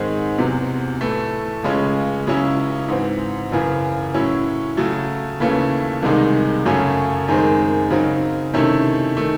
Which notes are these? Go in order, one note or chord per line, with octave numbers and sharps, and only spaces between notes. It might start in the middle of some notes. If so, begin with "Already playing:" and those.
Already playing: G#2 D#3 G#3 C4
E2 C3 F#3
A2 E3 A3
C#2 C#3 G#3 C#4
C#2 C#3 F#3 C#4 E4
G#2 E3 C4
F#2 C#3 E3
A2 F#3 C#4 E4
C#3 F#3 A3
D#2 C#3 E3 A3 C#4
C2 C3 D#3 G#3 D#4
F#2 C#3 F#3 A3 C#4
F#2 D#3 G#3 C4
C#3 F#3 C4 D#4
C3 D#3 A3 C#4 E4
D#3 A3